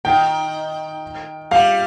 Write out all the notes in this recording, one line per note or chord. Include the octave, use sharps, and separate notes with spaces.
D#3 G5
G3 F5